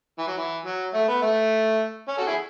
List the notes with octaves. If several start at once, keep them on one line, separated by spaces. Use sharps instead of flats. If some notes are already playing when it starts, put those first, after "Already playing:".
E3
F#3
E3
F#3
A3
B3
A3
C#4
F#4 A4
E4 G#4